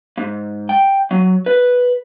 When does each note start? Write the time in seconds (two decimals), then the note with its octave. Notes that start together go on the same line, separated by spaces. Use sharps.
0.17 G#2
0.69 G5
1.11 F#3
1.46 B4